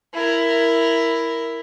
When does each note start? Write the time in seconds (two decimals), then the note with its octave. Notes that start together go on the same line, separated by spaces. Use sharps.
0.14 E4 A#4